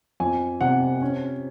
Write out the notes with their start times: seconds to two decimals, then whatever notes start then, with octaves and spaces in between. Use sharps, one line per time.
0.20 F2 G#5
0.61 C3 F#5
1.02 C#4